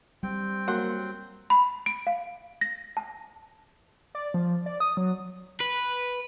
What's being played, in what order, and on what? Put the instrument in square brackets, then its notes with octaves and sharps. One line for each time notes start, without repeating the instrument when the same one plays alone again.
[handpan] G3 [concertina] C4 G5
[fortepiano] F#3 F#5 C6 [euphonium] A#3
[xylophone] B5
D7
F5
A#6
A5
[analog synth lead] D5
F3
D5
D#6
F#3
[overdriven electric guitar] B4